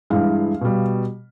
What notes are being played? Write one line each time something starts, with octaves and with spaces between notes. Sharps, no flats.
G2 E3 G#3 F5
B2 G3